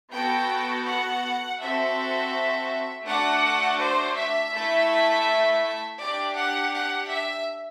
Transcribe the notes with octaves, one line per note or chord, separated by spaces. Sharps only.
B3 F#4 A4 G5
F#5
C4 F#4 A4 E5
A3 D4 F#4 A4 F#5
C5
E5
A3 E4 A4
D4 G4 D5
F#5
F#5
E5